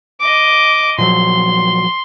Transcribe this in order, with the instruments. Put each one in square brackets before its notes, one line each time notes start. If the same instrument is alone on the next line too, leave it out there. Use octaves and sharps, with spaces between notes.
[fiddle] D#5 D6
[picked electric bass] A#2 F3 F#3 [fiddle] C6